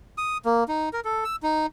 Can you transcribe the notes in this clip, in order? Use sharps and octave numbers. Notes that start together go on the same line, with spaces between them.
D#6
A#3
D#4
A#4
A4
E6
D#4